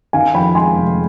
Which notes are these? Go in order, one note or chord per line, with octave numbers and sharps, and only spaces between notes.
D#3 F5 G#5
F2 G5 B5
G#3 G#5 C6
F1